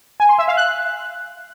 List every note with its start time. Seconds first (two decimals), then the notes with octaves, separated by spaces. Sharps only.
0.20 G#5
0.29 C6
0.38 E5
0.48 F5
0.57 F#6